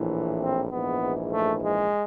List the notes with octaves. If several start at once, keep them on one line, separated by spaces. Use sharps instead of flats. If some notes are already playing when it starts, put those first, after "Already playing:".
Already playing: A#1 A2 E3
C4
A#1 G#2 E3 B3
A3
G#3